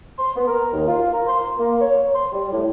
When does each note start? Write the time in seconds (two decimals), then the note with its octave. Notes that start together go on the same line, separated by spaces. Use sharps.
0.19 C6
0.35 B3
0.48 A#4
0.73 D#2
0.87 F4
1.12 A#4
1.27 C6
1.57 A#3
1.81 C#5
2.15 C6
2.33 G3
2.51 A2